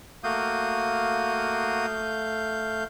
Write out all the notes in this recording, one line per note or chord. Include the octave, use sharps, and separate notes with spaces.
A3 A#3 F#4 F5 D#6 G6